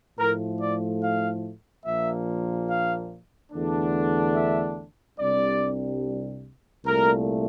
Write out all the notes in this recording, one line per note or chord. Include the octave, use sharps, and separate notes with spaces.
A2 F3 A3 A#4
D5
F5
A#1 A#2 F3 A#3 E5
F5
E2 D3 A3 D4
E5
C2 C3 G3 D4 D5
C2 A#2 A3 A#4